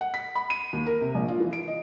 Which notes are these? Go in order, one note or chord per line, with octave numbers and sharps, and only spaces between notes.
F#5
B6
B5
D#7
D#2
A#4
C3
A#1
F4
E3
D7
D#5